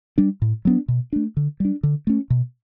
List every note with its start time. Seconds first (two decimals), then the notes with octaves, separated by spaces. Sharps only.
0.18 G3 D4
0.42 A2
0.65 F#3 B3 D4
0.88 B2
1.13 A3 D4
1.37 D3
1.60 G3 D4
1.83 D3
2.07 A3 C#4
2.30 B2